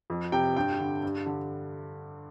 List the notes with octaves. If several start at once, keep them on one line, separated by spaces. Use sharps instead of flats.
F2
C3 G5
G2 G5
D3
G2
D3